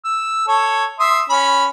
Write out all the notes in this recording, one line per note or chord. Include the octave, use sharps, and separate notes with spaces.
E6
A4 C#5
E5 C6 D#6
C#4 B5